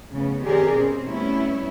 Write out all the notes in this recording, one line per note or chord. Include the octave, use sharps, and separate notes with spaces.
A2 C#3 B3
D#3 C4 G4 G#4 A#4 D5
B2 C4 C#4
G3 A3 B3 C#4 E4